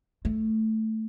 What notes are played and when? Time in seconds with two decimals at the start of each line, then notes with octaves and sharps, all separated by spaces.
0.25 A3